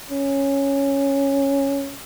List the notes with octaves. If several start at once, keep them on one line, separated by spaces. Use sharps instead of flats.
C#4